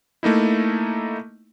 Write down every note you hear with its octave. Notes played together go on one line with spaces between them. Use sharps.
A3 A#3 D#4 E4